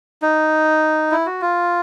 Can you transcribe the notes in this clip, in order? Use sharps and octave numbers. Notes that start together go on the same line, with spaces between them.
D#4
E4
F#4
F4